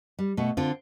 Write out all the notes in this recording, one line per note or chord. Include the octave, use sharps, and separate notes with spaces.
G3
B2 A3
D3 C4 F4